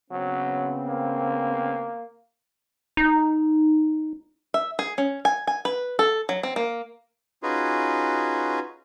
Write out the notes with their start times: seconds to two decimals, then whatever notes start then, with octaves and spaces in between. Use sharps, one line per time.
0.11 C#3 F#3 B3 C4
0.86 A#3
2.97 D#4
4.54 E5
4.79 G#4
4.98 C#4
5.25 G#5
5.47 G#5
5.65 B4
5.99 A4
6.29 F#3
6.43 C4
6.56 A#3
7.43 C#4 D#4 F4 F#4 G#4 B4